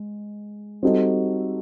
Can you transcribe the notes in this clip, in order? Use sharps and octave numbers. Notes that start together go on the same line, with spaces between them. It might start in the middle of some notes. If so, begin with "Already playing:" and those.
Already playing: G#3
G3 C4 D#4 F#4 A4